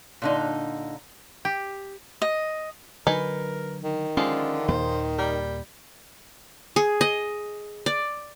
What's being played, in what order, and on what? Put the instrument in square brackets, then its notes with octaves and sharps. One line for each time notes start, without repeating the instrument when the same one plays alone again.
[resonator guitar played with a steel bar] A#2 D3 D#4
[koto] G4
[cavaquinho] D#5
[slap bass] D3 F#3 [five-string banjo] D#4 B4 G#5 [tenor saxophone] A#4
[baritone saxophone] D#3
[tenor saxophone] D3 [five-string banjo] F3 G#3 F4 [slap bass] C#4
[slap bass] D#2 A#2 [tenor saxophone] C5
[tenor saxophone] G3 [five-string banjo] A#4
[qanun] G#4
D#5
D5